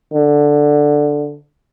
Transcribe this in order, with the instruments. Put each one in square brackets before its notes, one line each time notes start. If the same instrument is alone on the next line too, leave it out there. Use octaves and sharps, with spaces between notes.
[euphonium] D3